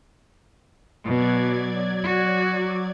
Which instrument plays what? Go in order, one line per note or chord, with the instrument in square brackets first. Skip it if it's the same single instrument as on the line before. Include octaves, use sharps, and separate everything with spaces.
[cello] B2 [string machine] F#3 D5 G#6
[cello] F#4